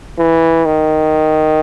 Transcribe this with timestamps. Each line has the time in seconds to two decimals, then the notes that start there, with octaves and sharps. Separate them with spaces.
0.18 E3
0.66 D#3